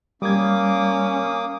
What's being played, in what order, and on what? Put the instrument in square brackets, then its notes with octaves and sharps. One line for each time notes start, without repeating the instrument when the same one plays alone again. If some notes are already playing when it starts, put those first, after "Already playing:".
[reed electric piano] G3 G#6 [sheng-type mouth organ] A#3 D6 D#6 [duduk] C#4